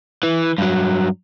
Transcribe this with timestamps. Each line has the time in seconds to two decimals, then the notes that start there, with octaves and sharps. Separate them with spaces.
0.23 E3
0.58 G2 F#3